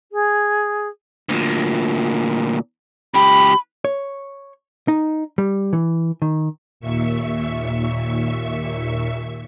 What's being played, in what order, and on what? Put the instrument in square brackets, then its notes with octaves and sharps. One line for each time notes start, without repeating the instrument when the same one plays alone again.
[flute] G#4
[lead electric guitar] D2 A#2
[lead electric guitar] C#2 G4 [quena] B5
[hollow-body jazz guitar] C#5
D#4
G3
E3
D#3
[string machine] D#2 A#2 E5 C#6